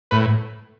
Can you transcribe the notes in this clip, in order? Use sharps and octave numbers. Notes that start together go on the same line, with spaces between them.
A2 B4